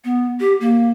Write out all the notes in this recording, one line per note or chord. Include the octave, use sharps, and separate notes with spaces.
B3
G4
A#3